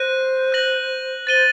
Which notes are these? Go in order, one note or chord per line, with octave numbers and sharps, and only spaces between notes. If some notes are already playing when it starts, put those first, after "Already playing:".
Already playing: C5 F#6 A#6 D#7
F#6 A#6 F#7
C5 A6 D#7 G7